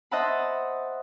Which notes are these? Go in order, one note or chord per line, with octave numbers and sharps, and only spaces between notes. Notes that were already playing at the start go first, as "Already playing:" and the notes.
C5 D#5 E5 F#5 A5 B5